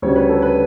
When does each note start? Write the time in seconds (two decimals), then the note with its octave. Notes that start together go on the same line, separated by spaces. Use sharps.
0.02 D2 C#3 G3 C#5
0.16 B4
0.29 A4
0.42 B4